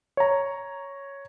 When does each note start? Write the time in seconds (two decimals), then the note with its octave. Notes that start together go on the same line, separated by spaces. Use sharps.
0.17 C#5 A#5